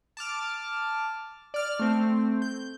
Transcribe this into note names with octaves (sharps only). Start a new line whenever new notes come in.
A5 D6 F6
D5 F6
A3 C4
G6